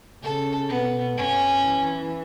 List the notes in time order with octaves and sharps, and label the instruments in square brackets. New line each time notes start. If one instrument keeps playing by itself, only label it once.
[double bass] C#3 [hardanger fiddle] A4
[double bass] B2 [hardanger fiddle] B3
[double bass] F#2 [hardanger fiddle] C#4
[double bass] E3